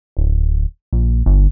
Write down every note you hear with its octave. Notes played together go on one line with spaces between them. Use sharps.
D1
A#1
G1